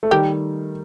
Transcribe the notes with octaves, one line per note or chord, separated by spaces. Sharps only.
A3
D#3 G3 G4 A#4